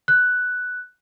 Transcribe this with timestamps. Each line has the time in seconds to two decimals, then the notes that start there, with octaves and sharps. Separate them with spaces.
0.08 F#6